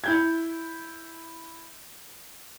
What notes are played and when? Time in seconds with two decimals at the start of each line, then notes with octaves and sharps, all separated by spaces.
0.04 E4 G6 G#6